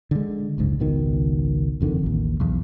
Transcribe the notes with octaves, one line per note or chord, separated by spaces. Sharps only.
D3 G#3
F#1 C#2 G#2
G#1 C#2 B2 D#3
F#1 F2 D3 D#3
A1 D#2
B1 E2